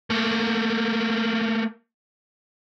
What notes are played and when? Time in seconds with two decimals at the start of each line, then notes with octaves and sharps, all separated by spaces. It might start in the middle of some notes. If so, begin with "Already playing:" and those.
0.10 A3 A#3